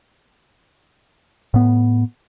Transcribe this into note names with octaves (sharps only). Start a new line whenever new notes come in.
A2 B3